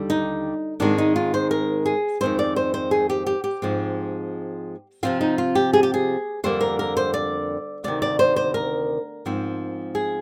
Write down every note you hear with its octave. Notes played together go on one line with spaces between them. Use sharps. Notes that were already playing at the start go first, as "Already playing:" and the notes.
Already playing: D#2 D3 G3
D#4
G#2 D#3 G#3 C4 D4
D#4
F4
C5
A#4
G#4
F2 C3 D#3 G#3 C4 C5
D5
C5
C5
G#4
G4
G4
G4
G#2 F3 G#3 C4
C3 F3 C4 F4
D#4
F4
G4
G#4
G4
G#4
F2 D3 G3 A#3 C5
A#4
A#4
C5
D5
D2 C3 D#3 D5
D5
C5
C5
A#4
G#2 F3 C4
G#4